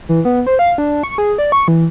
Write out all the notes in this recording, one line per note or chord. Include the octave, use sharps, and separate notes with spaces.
E3
B3
C5
F5
D4
C#6
G#4
D5
C#6
E3